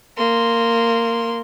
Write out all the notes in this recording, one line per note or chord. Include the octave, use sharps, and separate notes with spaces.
A#3 C6